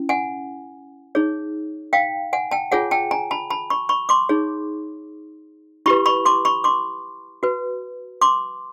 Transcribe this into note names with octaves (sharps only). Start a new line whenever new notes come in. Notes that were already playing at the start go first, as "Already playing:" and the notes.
Already playing: C#4 E4
F#5 G#5
D#4 G#4 C#5
F5 G5
F#5 G#5
G5 A5
F4 G#4 C#5 F#5 G#5
G5 A5
G#5 A#5
A5 B5
A5 B5
B5 C#6
B5 C#6
C6 D6
D#4 G#4 C#5
E4 G4 B4 B5 C#6
B5 C#6
C6 D6
B5 C#6
C6 D6
F#4 B4
C6 D6